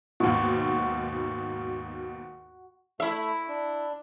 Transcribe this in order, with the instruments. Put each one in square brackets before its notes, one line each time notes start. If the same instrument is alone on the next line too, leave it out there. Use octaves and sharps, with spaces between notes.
[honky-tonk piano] D#2 G#2 B2 [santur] F#4
[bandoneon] A3 [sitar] E4 E5
[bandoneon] D4